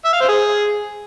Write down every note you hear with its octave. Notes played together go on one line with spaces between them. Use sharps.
E5
F5
C5
G#4